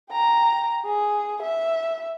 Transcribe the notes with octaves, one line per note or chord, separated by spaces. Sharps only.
G5 A#5
G#4
E5